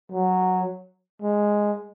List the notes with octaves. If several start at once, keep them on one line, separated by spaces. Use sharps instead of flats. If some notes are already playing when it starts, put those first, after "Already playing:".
F#3
G#3